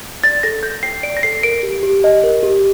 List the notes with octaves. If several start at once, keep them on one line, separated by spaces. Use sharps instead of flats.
D5 A6
A4 A#6
A4 G6
G5 C7
D5 D7
A#6
A4 C7
A#4 D7
G4
G4
D#5
A#4
G4